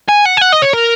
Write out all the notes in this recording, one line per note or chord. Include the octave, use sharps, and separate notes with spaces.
G#5
F#5
G#5
F#5
D#5
C#5
A#4